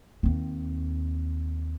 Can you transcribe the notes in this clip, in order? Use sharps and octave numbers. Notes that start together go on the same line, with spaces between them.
D#2 C4